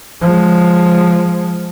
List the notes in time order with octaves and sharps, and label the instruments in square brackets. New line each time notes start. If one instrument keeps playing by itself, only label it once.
[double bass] F3 G#3